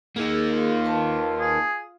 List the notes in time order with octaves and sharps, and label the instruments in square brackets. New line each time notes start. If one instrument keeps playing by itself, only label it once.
[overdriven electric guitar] A#3 D#4 [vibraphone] G#4
[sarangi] F4
[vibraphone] B4 A5
[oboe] G#4